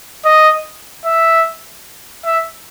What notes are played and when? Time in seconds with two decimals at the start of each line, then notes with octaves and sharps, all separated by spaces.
0.25 D#5
1.05 E5
2.25 E5